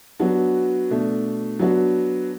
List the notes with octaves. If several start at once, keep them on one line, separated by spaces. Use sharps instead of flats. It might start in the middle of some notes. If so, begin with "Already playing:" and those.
F#3 B3 D4 F#4
B2 A3 D4
F#3 B3 D4 F#4